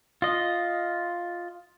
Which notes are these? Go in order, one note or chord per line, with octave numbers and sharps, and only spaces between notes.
F4 D#5